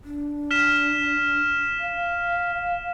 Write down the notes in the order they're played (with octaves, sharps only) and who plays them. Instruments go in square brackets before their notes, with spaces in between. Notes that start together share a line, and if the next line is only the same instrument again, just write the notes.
[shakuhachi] D4
[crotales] F6 B6 E7
[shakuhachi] F5